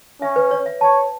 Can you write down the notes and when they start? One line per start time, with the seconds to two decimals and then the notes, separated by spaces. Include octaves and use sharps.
0.22 C#4 E5
0.36 B4
0.51 C#5
0.66 E5
0.81 C#5 A5